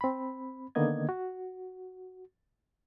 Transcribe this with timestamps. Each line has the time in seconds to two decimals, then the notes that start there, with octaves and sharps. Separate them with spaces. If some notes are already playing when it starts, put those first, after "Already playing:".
0.01 C4 B5
0.75 D3 D#3 A#3 B3 D#5 G#6
1.09 F#4